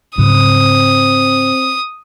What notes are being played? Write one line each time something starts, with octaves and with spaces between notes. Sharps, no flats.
G#2 C#3 F#3 C4 D#6